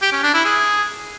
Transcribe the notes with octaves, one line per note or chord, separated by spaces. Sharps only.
G4
C#4
D4
E4
G#4